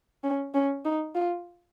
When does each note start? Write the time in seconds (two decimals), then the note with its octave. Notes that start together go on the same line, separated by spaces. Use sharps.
0.24 C#4
0.54 C#4
0.85 D#4
1.15 F4